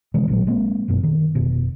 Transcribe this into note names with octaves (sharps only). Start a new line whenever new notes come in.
C3 D#3 E3 G#3
A1 A#2 C#3 F#3
G#3 A#3 C4
G1 F#2 B2
D#3
F1 B2